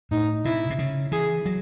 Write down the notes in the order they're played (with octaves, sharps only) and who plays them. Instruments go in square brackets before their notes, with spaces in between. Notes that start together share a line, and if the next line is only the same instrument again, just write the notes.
[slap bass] A2 [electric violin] D#4
[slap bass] C3 [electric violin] E4
[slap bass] C3
C#3
[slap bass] E3 [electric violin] G#4
[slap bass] F#3